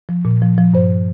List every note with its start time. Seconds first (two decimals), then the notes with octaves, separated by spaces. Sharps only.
0.09 F3
0.25 A#2
0.42 F3
0.58 F3
0.74 G2 C5